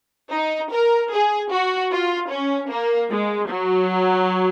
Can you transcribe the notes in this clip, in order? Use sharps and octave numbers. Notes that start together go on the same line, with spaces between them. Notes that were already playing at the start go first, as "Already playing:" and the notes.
D#4
A#4
G#4
F#4
F4
C#4
A#3
G#3
F#3